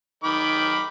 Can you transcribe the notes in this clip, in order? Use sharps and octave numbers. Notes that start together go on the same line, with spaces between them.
D#3 B5 D6